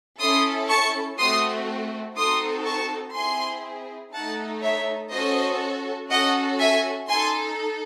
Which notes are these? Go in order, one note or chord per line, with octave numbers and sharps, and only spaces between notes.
C#4 E4 A4 C6 D#6
A5 C#6
A3 C4 F#4 C6 D#6
C4 D#4 F#4 A4 C6 D#6
A5 C#6
C4 E4 G#4 G#5 C6
A3 D#4 A4 F#5 A5
C#5 E5
C#4 F#4 A4 C5 D#5
C#4 F#4 A4 D#5 F#5
E5 G#5
D#4 A4 G#5 C6